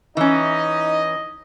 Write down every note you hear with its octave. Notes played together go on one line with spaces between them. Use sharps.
E3 C#4 D#4 D#5